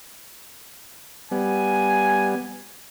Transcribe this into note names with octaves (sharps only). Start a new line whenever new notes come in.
G3 B3 G#5